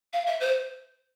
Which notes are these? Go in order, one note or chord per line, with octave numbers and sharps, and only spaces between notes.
F5
E5
C5